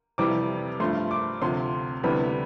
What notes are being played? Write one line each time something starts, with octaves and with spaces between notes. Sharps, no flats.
F2 C3 E3 G3 D6
G2 F3 A3 C6
D6
D2 C3 F3 C6
D2 C3 E3 G3 B3 B5